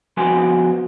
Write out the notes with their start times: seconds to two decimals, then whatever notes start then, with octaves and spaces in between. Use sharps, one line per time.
0.17 F3 B3 F#4 G#5 C6